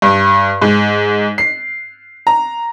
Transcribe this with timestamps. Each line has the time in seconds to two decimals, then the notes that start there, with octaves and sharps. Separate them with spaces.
0.02 G2
0.61 G#2
1.38 C7
2.27 A#5